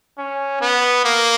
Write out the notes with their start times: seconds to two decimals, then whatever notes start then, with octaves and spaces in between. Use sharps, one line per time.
0.18 C#4
0.61 B3
1.04 A#3